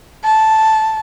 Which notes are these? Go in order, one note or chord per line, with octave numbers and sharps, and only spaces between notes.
A5